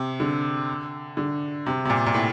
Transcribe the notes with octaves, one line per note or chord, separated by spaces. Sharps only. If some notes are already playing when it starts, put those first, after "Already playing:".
Already playing: C3
D3
D3
C3
C3
A#2
A#2
A2